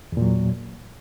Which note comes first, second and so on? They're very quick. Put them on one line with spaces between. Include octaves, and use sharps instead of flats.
E2 A#2 F#3